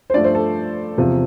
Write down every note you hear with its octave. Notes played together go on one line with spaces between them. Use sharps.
C5
G2 F3 A3 D5
C5
A4
E2 C3 F3